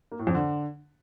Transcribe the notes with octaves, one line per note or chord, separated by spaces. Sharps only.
A#3
A2
F2
D3